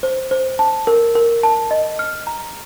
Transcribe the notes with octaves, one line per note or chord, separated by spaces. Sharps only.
C5
C5
A5
A#4
A#4
A5
D#5
F6
A#5